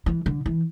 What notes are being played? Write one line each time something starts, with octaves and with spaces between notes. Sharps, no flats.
E3
D3
E3